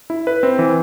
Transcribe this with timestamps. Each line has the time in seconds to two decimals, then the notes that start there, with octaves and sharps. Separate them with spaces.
0.10 E4
0.27 B4
0.43 C4
0.59 E3